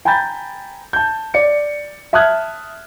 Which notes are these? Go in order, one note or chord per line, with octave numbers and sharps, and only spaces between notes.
G5 G#5 A#5 B5 G6 A6
A5 G6
D5 C#7
E5 A5 D#6 F6 F#6 G#6